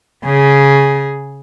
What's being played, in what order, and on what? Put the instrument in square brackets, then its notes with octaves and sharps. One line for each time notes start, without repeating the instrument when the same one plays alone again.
[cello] C#3 G#4